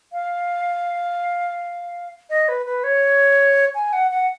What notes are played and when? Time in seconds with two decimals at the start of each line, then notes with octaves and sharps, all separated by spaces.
0.13 F5
2.30 D#5
2.48 B4
2.66 B4
2.84 C#5
3.75 G#5
3.93 F#5
4.11 F#5